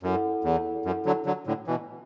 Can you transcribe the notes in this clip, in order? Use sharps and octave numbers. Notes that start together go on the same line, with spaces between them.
F#2 E4 A4 F#5
E2
F#2
D3 F#3
D3 F#3
A2 D3
B2 E3